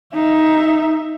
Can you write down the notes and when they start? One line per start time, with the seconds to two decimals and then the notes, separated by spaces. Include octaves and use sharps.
0.13 D#4 E5